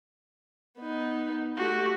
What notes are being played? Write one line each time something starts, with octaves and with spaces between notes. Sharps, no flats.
B3 D#4
A3 F#4 G4